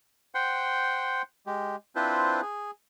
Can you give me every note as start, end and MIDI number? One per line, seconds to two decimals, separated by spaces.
0.35 1.22 72
0.35 1.22 78
0.35 1.22 79
0.35 1.22 84
1.46 1.76 56
1.46 1.76 67
1.95 2.41 60
1.95 2.41 62
1.95 2.41 64
1.95 2.41 65
1.95 2.41 71
1.95 2.41 72
2.42 2.71 68